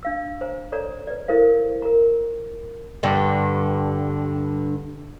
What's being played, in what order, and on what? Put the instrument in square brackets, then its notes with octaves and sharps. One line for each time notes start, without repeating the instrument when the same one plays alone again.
[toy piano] D4 F5 E6
C5 G#5 A#5
A4 C#5 D5 A#5
B4 D5
E4 A4 A#4 C5 F5
A#4 A#5
[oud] G2 D3